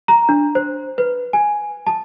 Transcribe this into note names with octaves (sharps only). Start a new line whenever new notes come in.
A#5
D4
C5
B4
G#5
A5